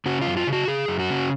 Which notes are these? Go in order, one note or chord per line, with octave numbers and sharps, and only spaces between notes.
C#3 F#4
F4
F#2
F4
C#3
F#4
C#3 G#4
F#2
F#4
C#3